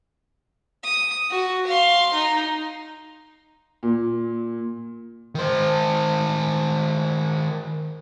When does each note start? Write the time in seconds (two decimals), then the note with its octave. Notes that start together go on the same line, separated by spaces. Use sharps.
0.84 D#6
1.31 F#4
1.67 F5 C6
2.13 D#4
3.83 A#2
5.35 D#3 C5